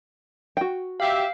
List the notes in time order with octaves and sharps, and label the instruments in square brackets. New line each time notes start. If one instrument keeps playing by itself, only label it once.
[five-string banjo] F#4 G5
[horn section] G4 E5 [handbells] F5